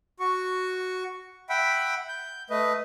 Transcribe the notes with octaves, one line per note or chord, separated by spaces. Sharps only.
F#4 C#6
E5 F#5 G5 B5
G6
A3 B4 D#5